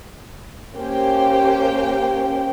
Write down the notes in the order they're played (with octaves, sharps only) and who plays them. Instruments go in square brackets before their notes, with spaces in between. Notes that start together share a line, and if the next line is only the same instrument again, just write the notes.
[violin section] A#3 C#4 G4 C5 G5